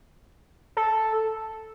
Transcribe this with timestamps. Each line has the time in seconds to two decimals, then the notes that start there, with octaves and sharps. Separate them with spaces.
0.77 A4